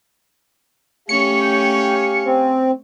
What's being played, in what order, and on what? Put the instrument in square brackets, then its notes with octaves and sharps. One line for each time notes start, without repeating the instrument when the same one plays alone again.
[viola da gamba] A3 C#4 C#5 [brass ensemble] G4 F5 G#5 [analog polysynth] C#7
[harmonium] G5
C4